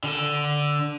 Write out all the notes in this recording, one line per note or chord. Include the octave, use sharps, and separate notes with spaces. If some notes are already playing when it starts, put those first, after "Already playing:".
D3 A4